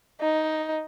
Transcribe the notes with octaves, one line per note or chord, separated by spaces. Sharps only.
D#4